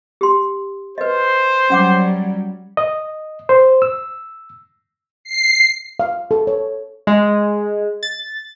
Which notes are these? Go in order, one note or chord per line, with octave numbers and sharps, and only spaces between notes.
G4 C6
B4 C5 D#5
F#3 G3 C#4 F#5 D6
D#5
C5
E6
C7
F5
A4
C#5
G#3
A6